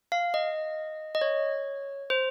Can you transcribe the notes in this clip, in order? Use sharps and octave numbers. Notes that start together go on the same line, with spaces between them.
F5
D#5
D#5
C#5
C5